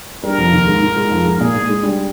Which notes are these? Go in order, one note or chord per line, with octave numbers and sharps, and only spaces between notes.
G2 G3 A#4
F2 F3
D#2 D#3
G#2 G#3
G#2 G#3
G#2 G#3
F2 F3
G#2 G#3
A#2 A#3 G#4
G#2 G#3
G#2 G#3
G2 G3